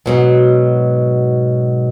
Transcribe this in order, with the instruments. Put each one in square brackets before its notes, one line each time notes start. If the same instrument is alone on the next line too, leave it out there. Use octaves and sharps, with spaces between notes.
[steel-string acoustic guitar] G#2 B2 F#3